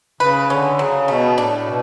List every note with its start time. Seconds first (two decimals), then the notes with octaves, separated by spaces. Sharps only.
0.20 C#3 B4
0.50 D3 C#4
0.79 C#3 F#3
1.08 B2 A3
1.38 A2 D4
1.67 B2